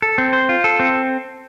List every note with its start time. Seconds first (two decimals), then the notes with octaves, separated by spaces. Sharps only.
0.02 A4
0.18 C4
0.33 C5
0.49 F4
0.64 A4
0.80 C4